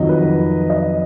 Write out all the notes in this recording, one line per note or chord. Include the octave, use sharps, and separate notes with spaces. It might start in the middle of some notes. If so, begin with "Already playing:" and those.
Already playing: F2 D#3 F#3 D#5
B4
D#5